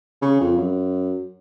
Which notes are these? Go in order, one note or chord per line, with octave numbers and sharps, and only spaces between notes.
C#3
F2
F#2